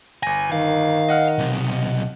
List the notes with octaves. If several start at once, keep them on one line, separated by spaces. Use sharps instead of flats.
G1 G#5 A#6
D#3 F5
D#5 F#5 F6
B1 C3